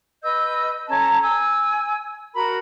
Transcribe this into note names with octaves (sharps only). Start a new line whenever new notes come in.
B4 D#5 E6 G6
C#4 A4 A5 A#5
G#5 E6
F#4 A#4 B5